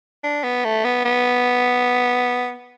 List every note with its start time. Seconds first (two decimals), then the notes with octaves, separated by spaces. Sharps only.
0.23 D4
0.44 B3
0.64 A3
0.84 B3
1.05 B3